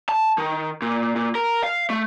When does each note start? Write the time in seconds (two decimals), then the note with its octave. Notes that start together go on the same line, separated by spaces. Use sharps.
0.09 A5
0.38 D#3
0.82 A#2
1.16 A#2
1.35 A#4
1.64 F5
1.90 A3